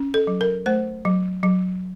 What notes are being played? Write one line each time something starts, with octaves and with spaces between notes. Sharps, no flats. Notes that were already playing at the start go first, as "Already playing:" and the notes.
Already playing: C#4
A4
F#3
A#4
A3 C5
F#3
F#3